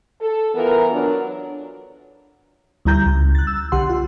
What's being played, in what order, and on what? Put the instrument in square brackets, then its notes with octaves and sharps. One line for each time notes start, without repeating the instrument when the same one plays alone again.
[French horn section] A4
E3 B3 F4 A#4
F#3 D4
[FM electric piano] D2 G3 E4 A#5 G6
C#2
F#6 A6
E6
B1 D3 G4 F#5 C6
F4